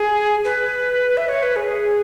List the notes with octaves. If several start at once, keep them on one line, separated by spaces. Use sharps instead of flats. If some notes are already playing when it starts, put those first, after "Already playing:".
Already playing: G#4
B4
E5
C#5
B4
G#4